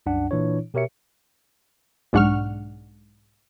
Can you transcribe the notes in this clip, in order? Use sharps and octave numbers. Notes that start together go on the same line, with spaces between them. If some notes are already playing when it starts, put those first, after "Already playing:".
C2 F#2 D4 F#5
A#2 E3 D4 E4 C#5
B2 G4 A#4 C#5 E5 C#7
B1 G#2 D4 F#5 C#6 F6